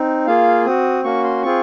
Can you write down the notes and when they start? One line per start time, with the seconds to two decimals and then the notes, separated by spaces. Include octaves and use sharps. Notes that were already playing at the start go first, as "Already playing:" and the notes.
Already playing: C4 D#4
0.27 A#3 F4 G#4 F5
0.66 C4 F#4 D#6
1.04 A#3 C#4 F#4 C#6
1.24 C6
1.43 C4 F4 G#4 C#6